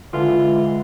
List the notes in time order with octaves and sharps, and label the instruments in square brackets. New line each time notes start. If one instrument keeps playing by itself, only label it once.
[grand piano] D3 [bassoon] E3 [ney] G#3 [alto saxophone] F4